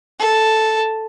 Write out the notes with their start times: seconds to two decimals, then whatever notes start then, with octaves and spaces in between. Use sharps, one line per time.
0.19 A4